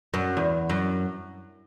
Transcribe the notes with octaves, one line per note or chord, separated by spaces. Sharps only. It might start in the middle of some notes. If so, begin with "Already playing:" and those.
F#2
E2
F#2